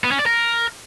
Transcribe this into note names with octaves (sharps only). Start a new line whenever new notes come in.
B3
C#4
D5
A#4